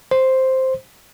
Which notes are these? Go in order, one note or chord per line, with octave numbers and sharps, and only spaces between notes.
C5